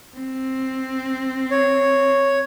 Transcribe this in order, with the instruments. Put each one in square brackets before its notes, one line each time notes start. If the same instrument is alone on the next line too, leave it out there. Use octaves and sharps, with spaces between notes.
[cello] C4
[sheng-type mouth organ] C#5